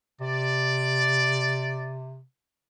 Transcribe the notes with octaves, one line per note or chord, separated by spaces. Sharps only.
C3 D5